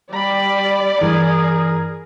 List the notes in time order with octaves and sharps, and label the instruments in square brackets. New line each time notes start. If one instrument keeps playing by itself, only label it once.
[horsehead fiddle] G3 [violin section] D5 [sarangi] B5
[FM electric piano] G2 E3 [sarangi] G#4 [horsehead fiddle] A#4